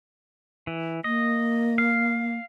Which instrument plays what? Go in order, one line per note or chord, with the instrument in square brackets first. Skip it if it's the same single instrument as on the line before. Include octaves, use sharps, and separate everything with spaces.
[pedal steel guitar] E3
[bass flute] A#3 [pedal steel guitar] D#5
[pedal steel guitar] F5